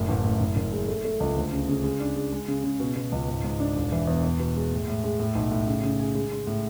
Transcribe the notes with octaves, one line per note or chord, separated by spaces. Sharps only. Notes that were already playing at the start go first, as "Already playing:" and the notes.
Already playing: F#1 A2
A1
A2
F#1
F#1
G#3
A3
A3
C#2
D2
C#3
C#3
G#3
D4
G#3
G#3
C#3
C#3
B2
B2
C#2
G#2
G#2
D4
E1
E3
E2
E2
B2
G#3
A2
A2
G#3
A2
B1
A2
C#3
C#3
G#4
G#3
G#3
A2